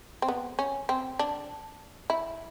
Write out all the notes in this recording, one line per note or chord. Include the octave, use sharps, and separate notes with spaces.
C4
B3
C#4
C4
D4
E4